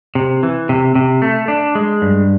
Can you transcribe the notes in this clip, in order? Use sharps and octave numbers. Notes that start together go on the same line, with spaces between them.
C3
E3
C3
C3
A3
D4
G#3
G2